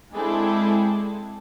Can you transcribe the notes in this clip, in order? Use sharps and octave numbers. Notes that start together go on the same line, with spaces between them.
G#3 C4 D4 E4 G#4 A4